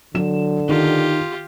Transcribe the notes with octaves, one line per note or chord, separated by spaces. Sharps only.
D3 F#3 E7
D#3 F4 G4